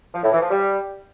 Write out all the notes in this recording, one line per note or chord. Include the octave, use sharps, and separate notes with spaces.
F3
A2
E3
F3
G3